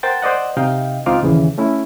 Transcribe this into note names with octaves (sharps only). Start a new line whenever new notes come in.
A#4 C5 F#5 G5 A6
C5 D5 D#5 F#5
C3 D#4 D#5 F5 G5
C#2 C4 D#4 F4 D6 F6
D#2 C#3 E3
A3 C#4 E4